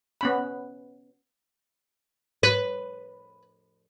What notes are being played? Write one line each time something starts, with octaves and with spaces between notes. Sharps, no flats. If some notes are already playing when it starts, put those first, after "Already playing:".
B3 C#4 B5
B4